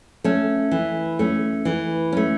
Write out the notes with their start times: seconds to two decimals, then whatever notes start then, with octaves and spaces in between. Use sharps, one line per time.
0.24 A3 C#4
0.71 E3
1.19 A3 C#4
1.65 E3
2.12 A3 C#4